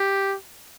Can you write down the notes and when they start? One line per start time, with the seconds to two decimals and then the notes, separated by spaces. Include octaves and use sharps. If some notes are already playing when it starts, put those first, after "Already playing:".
Already playing: G4